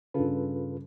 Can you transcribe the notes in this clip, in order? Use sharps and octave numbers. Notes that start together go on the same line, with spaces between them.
G2 C#3 F4 A4 B4